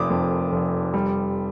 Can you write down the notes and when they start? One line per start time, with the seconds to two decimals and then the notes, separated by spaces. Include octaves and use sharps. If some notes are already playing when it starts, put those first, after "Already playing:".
Already playing: F1 F2 D6 D#6
0.10 F2
0.52 F1
0.94 G3